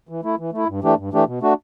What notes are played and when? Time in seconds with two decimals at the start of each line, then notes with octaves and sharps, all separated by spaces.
0.09 E3
0.23 A3 E4
0.39 E3
0.53 A3 E4
0.68 G2
0.82 E3 A3 D4 G4
0.98 G2
1.12 E3 A3 D4 G4
1.27 B2
1.41 A3 D4 F#4